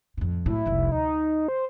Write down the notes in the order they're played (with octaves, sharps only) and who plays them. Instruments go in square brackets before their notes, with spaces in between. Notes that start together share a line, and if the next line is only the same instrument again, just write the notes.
[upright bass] F2 A2
[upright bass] D1 A2 [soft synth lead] E4
[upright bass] F1 C2
[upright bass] D2 [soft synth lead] D#4
[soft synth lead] C5